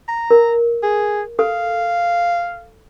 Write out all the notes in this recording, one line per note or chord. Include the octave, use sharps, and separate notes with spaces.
A#5
A#4
G#4
A4 F5